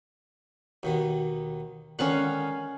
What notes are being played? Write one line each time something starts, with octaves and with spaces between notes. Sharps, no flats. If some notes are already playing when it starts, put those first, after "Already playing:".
D#2 B2 D#3
D3 D#3 G#3 C#4 F5 F#5